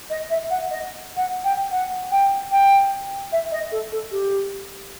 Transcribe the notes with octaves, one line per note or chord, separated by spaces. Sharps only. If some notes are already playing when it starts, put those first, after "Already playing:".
D#5
E5
F#5
D#5
F#5
G5
F#5
G5
G5
E5
D#5
A4
A4
G4